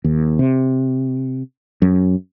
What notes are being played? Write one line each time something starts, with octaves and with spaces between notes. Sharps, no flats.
D#2
C3
F#2